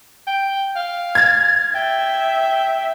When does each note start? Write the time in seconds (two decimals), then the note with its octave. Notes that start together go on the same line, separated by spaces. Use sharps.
0.27 G5
0.76 F5
1.15 G#6 A6
1.75 E5 G5